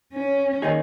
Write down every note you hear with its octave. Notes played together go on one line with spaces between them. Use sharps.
C#4
D#3 A#3 D#4 G#4